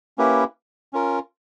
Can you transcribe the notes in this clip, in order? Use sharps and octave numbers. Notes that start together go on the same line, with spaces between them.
A#3 C#4 E4 G4 B4
C#4 F4 A#4